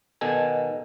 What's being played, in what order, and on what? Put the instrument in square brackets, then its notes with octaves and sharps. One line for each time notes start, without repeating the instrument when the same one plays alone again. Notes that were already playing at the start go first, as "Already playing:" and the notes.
[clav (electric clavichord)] B2 D#3 A4 G#5